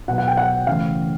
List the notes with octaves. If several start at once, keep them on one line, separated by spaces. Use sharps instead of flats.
B2 F#3 B3 F#5
F#5
G5
F#5
C#3 E3 A3 F5